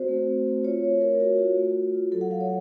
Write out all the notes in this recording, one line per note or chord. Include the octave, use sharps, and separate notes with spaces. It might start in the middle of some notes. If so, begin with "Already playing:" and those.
Already playing: C4 F#4 C5
A3
A3
A3
F4 C#5
A3
F4 A#4
F4 F#4
F4 F#4
A3
A3
F4
F#3 A4
F#5
F#3 F5
C#5